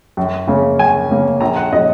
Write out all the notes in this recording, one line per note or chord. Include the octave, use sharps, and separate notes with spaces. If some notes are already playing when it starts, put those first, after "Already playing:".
F#2
C#3 A#3 C#4
F#2 G#5
C#3 A#3 C#4
A#1 A#5
F#5
A#2 F#3 D#5